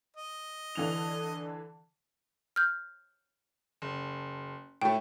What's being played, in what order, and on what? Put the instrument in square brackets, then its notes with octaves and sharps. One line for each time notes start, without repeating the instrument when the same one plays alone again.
[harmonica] D#5
[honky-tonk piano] D3 E3 F7
[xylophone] F6 G6
[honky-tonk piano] F#1
[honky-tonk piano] A2 A3 [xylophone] G5